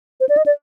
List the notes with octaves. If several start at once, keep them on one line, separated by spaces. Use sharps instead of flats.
C5
D5
D#5
D5